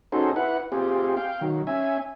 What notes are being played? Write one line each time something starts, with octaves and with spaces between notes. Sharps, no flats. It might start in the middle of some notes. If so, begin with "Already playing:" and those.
C#4 D#4 F#4 G#4 A4 C5
E4 B4 F#5
C4 F4 G4 G#4
F5 G5
D#3 F#3
C#4 E5 G#5